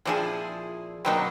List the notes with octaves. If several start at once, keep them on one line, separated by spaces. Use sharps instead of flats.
A#2 F3 C4 D4 E4 G#4
B2 F#3 A#3 C4 D4 D#4